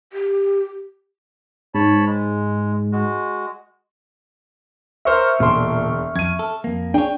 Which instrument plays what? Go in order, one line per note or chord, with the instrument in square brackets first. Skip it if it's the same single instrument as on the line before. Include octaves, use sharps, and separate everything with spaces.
[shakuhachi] G4
[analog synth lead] G#2 [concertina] C#5 A5 B5
[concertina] G#3
G#3 F#4
[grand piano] A#4 C5 [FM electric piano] E5 C#6 F6
[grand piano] E1 C6 [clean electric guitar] A#2 D3 D4
[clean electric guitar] F2 [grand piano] G#6 D#7
[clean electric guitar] A4
F2 A#3
[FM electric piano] D4 [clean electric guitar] G#4 C#5 [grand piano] G5